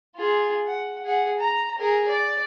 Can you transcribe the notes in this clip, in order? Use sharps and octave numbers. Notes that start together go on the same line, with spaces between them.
F4 G#4
F#5
G#4 F#5
A#5
G#4 A#4
D5